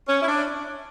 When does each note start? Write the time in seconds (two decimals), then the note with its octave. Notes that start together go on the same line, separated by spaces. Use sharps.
0.08 C#4
0.22 E4
0.27 D4